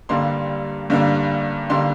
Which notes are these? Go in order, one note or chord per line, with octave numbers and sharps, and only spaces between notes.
G2 D3 G3 A#3 C6
G2 D3 G3 A#3
D3 G3 A#3 C6